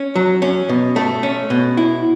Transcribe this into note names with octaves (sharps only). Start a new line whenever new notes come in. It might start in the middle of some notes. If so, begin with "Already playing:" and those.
Already playing: C#4
F#3
C#4
B2
A3
C#4
B2
E4